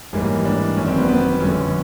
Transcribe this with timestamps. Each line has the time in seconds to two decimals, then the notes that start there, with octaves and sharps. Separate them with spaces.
0.13 A1 G#2 E3 G3 A#3
0.45 D4
0.76 G#1 F#2 D#3 C#4
0.87 C4
0.98 B3
1.08 B3
1.40 G1 F2 D3 C#4